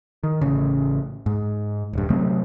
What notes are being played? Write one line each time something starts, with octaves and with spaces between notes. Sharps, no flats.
D#3
A1 C#3
G#2
D#1 G2
C3 F#3 A3 C4